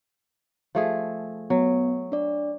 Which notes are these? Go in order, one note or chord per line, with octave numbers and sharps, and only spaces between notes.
F3 A3 G#4
F#3 B3
D4 D5